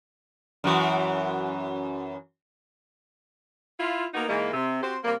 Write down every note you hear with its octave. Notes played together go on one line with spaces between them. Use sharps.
F#2 E3 F#4
E4 F4
A#3 B3 D#4 F#4 A#4
G#2 E3 G#3 A#3
C3
C4 F#4 G4 C5
C3 G3 A#3